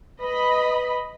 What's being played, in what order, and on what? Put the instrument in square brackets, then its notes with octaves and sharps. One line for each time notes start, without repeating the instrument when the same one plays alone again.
[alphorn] B4 [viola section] D#5 B5